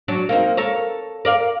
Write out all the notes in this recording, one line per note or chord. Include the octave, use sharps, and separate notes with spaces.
F#3 D4
A#3 C4 D#4
A4 A#4 C#5
A#4 D5 F5